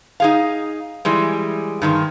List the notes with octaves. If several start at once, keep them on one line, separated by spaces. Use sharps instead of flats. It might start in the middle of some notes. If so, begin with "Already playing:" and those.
D#4 G#4 F5
E3 G3 G#3
G2 D#3 G#3